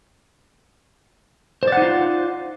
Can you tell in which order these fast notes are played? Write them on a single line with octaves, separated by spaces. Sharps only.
C5 D5 F#5 D#4 F4